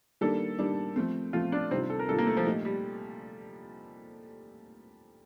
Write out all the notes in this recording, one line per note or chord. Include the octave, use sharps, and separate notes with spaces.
D#3 G3 A#3 D4 A4
D#3 G3 A#3 D4
F3 A3 C4
F3 A3 C4 F4
D4
C3 D#3 G3 C4 D4 F4
A4
A#4
C3 D#3 G3 D4 F4 A4
A#3
A3
F3
A#2 A3 D#4 G4
G3